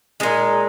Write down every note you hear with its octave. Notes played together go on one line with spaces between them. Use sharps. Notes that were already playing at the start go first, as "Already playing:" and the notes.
A#2 G#3 D#4